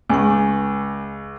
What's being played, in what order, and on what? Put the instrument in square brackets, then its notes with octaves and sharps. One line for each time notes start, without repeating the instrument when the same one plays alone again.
[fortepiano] C#2 [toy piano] G#5 C#6